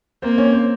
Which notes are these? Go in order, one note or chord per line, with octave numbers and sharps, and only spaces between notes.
A#3 C4 C5
C#4 C#5
C4 C5